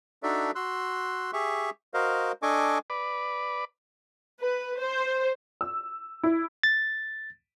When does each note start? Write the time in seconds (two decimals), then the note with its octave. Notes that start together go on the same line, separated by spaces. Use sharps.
0.23 D4 D#4 F#4 A4 D5 E5
0.55 F#4 C6 E6 F#6
1.33 G4 G#4 E5 C#6
1.94 F#4 A#4 C5 D#5 F5
2.42 D4 A4 D#5 G#5 C#6 D6
2.90 B4 D5
4.41 B4
4.80 C5
5.61 E6
6.23 E4
6.63 A6